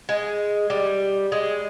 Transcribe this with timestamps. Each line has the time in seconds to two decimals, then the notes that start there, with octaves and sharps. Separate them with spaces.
0.09 G#3
0.70 G3
1.32 G#3